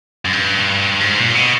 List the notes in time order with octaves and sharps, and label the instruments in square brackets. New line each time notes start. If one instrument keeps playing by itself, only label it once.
[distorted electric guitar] F#2
G2
G#2
A#2
B2